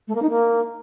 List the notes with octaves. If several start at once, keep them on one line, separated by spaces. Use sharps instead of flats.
A3
A#3
D#4
A#3